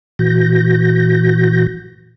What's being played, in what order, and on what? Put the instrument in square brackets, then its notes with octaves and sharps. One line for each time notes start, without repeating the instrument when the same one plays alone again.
[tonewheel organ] A#2 E3 F#4 G6 A#6